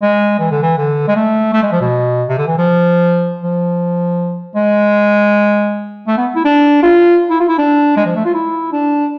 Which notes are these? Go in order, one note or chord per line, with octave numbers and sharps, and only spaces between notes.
G#3
E3
D3
E3
D3
G#3
A3
A3
G#3
F3
B2
C3
D3
E3
F3
F3
G#3
A3
B3
E4
D4
F4
E4
F4
E4
D4
G#3
F3
A3
F4
E4
D4